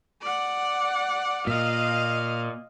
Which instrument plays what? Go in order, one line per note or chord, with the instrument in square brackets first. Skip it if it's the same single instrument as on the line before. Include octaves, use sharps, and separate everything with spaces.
[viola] D5 F#5
[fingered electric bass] A#2 [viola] D#5 F5